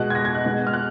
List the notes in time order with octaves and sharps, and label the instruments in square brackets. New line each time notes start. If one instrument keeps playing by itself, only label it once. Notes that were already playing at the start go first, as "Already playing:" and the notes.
Already playing: [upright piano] B2 G#3 F#6
G#6
A#6
G#6
F#6
B2 G#3
F6
F#6